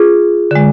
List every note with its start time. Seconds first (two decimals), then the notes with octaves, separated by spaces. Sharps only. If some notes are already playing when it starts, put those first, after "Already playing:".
Already playing: F4 G#4
0.51 D3 G#3